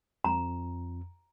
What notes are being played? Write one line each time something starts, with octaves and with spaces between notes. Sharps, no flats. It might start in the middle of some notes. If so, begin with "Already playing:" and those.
F2 A#5